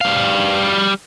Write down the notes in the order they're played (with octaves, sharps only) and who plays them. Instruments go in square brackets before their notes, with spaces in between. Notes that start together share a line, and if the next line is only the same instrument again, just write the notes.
[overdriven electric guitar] G3 F5